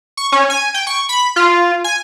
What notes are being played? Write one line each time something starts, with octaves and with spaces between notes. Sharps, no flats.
C#6
C#4
G#5
G5
C#6
B5
F4
G#5